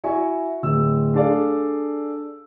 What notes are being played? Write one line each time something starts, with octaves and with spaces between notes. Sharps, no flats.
E4 F#4 E5 G#5 C#6
D1 E6
D4 G#4 A4 D5 F5